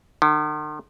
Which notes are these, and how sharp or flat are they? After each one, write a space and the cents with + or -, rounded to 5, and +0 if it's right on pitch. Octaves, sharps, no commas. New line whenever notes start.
D#3 -45